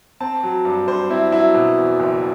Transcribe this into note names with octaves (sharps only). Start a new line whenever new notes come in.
C4 A5
F#3
G2
G2 C5
C4 E4
F#3 E4
B2
E2
F#1